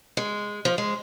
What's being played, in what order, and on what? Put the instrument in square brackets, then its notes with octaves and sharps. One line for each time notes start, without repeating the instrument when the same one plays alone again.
[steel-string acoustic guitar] G#3
F3
G#3